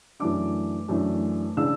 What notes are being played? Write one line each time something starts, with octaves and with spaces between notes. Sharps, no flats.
F#2 E3 A3 D4 D6
F#2 E3 A3 D4
C#3 E3 G#3 D4 E6